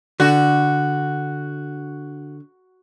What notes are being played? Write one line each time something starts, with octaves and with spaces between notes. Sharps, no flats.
D3 F#4